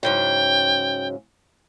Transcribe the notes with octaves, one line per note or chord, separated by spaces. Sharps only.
G#2 C#3 F#3 G5